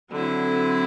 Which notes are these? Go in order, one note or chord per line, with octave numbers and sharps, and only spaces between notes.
D3 F#3 C4 E4